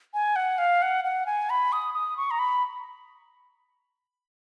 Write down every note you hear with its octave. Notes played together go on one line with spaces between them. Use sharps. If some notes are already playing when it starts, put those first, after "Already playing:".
G#5
F#5
F5
F#5
F#5
G#5
B5
D#6
D#6
C#6
A#5
B5